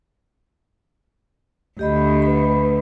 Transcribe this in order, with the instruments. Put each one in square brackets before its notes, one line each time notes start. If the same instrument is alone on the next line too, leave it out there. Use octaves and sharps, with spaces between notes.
[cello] D2 [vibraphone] G4 D#5 B5
[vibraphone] B4 B5